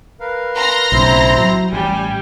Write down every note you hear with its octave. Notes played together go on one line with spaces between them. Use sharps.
A#4 B4 F5
A#5 C6 A#6
B1 A2 C#3 C4 E4 C5
F#3
A1 G3 G#5